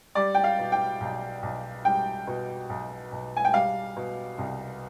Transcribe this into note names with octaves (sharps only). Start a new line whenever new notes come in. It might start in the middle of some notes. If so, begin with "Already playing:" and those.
G3 D5
G5
F5
B2
G5
B1
B1
G3 G5
B2
B1
B1
G#5
G5
G3 F5
B2
C2